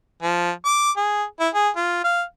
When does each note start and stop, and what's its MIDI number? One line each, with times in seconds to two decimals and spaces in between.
0.22 0.51 53
0.65 0.91 86
0.96 1.24 68
1.40 1.49 64
1.54 1.69 68
1.76 2.01 65
2.04 2.23 77